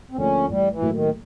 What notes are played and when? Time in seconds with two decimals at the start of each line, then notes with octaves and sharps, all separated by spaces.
0.11 C4
0.17 D2 D3 F3 A#3 C#4
0.49 A1 G3
0.71 E3
0.82 A2 F#3 A#3
0.93 D#3